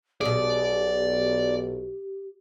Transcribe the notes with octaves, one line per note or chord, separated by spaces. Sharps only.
B1 B2 G4 G#4 D5